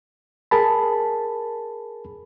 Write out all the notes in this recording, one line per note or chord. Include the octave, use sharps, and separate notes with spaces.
G#4 A#4 A5 B5